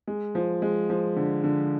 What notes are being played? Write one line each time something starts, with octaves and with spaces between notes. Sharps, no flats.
G#3
F3
G#3
F3
D3
D3